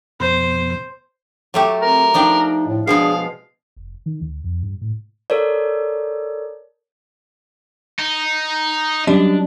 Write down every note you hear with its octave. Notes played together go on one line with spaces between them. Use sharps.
F2 B2 C5
F#3 A3 G4
C4 A#4
F3 D4 D#4 G5
A2
B2 F3 G#3 D4 G#4 F5
F1
D#3
D2
F2
G2
A2
A4 A#4 C#5 D5
D#4
F#3 G3 C#4 D4 G4 D#5